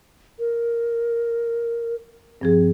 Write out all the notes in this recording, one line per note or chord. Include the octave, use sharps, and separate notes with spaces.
A#4
G2 F3 C4 G#4